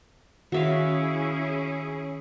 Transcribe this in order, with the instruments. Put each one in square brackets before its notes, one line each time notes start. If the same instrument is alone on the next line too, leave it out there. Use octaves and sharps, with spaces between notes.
[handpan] D#3 [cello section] C#4 E4 G#4 [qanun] F#4 E5 F5